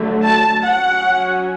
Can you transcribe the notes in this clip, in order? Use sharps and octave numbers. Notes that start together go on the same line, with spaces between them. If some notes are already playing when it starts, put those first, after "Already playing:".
Already playing: D3 F#3 A3
A5
F#3 C#4 F#5